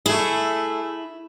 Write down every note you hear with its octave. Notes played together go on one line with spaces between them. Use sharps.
A3 E4 G#4